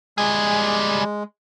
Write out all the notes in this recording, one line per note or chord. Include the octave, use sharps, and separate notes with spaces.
G3 G#3 G#4